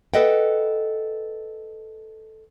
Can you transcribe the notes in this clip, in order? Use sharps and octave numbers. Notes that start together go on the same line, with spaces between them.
A4 B4 D#5 E5 F#5 G5